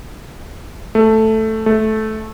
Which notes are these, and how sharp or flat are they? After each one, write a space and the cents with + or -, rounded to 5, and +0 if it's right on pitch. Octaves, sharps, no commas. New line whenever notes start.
A3 +0
A3 -15